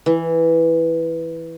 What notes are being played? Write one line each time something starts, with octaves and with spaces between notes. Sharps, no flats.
E3